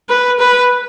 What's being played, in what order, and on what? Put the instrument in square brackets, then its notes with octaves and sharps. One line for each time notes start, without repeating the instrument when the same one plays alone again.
[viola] B4
B4